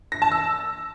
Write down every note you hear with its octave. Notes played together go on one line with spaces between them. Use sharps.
A#6
A5
E6